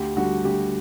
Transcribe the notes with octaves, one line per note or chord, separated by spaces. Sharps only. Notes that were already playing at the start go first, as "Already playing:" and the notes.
Already playing: D2 G4
D3 G3 F#4
D2 G4